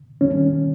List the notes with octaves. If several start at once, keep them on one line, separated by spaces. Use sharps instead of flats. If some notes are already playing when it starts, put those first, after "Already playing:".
D#3 G3 C#4